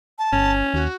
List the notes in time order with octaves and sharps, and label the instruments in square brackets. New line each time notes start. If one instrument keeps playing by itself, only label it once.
[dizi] A5
[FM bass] G1 [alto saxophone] C#4
[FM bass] D#2 [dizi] F#4